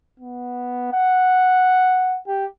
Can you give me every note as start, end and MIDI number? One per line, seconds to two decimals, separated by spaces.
0.20 0.91 59
0.93 2.18 78
2.27 2.45 67